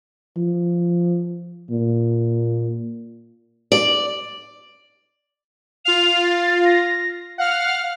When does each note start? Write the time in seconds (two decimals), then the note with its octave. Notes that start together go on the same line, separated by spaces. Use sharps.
0.37 F3
1.70 A#2
3.72 D5
5.85 F4 F5 F7
6.24 A6
6.65 A#6
7.38 F5 F#5 F6